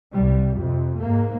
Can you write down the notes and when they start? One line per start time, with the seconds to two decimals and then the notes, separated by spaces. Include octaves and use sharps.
0.13 C2 G3
0.58 F2 C3
1.00 G#2 A#3